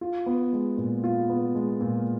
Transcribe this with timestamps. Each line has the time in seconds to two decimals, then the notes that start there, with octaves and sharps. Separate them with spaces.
0.01 F4
0.26 B3
0.53 G#3
0.78 A#2
1.04 F4
1.30 B3
1.55 G#3
1.81 A#2